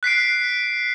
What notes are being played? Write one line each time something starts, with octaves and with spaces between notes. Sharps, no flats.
F#6 B6 C7 D7